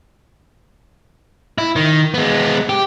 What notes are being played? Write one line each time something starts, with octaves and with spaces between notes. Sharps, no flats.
E4
D#3
G#3 B3
G4